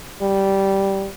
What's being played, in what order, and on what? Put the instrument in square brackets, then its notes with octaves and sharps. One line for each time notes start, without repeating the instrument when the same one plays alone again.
[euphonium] G3